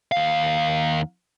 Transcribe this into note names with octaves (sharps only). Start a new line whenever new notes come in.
D#2 F5